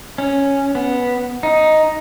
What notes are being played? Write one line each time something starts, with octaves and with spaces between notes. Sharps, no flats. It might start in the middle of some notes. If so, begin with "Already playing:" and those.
C#4
B3
D#4